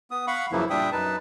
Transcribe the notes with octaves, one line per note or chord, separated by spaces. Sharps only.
B3 D#6
F5 F#5 B5 C#6
F#2 C#3 E3 F3 A#3 E4
A#2 G3 D4 E5 G5 D#6
F#2 D#4 B4 A5